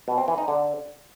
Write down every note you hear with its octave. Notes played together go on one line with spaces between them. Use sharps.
B2
C4
E3
D#4
D3